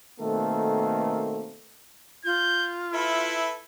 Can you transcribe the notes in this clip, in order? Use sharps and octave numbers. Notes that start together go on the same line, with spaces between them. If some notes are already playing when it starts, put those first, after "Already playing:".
B2 D#3 A3 A#3 C4 A4
F4 G6
E4 A4 B4 E5